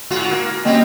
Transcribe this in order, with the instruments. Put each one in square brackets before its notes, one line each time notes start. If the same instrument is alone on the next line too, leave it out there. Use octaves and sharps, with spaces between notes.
[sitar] G#2 F4 F#4
A#3
[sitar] G3 C4 C#4 [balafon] A#3 [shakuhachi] D#5